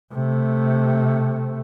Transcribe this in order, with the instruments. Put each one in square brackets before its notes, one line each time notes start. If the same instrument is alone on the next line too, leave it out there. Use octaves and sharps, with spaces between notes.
[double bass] C3 A3